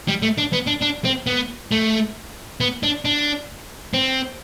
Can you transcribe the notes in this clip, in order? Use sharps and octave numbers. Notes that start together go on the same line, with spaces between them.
G3
A3
D4
B3
D4
D4
C4
B3
A3
B3
D4
D4
C4